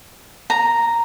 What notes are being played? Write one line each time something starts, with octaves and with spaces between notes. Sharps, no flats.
A#5